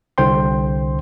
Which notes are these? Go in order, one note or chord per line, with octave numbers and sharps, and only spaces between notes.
C2 D3 C5 G5 C6